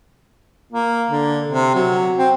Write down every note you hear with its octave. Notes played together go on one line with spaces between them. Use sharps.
A#3
D3
C3
F#3
C4